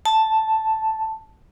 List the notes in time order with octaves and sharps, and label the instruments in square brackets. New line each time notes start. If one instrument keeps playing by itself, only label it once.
[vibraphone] A5